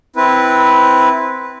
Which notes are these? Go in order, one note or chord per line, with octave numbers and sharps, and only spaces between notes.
C4 E4 B4